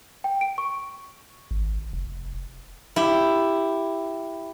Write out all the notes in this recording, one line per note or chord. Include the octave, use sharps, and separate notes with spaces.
G5
D7
C#6
G#1
F1
E4 G4